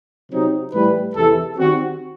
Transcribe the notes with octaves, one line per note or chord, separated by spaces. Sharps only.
C3 F#3 C4 D#4
A2 E3 G3 B4
E2 C3 E3 A4
D#3 G3 C4 F#4